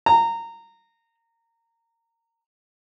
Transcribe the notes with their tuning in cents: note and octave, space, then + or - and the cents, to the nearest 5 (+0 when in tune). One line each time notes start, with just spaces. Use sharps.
A#5 -20